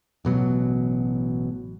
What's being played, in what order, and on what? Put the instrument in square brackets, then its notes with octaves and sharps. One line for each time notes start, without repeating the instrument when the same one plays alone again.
[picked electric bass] A1 B2 F#3